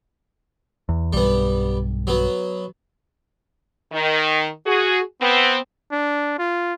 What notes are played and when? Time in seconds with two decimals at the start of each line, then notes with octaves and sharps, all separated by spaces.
0.89 E2
1.13 B1 G2 G3 B3
2.07 F#3 B3
3.92 D#3
4.67 F#4 G#4
5.21 B3 C4
5.92 D4
6.39 F4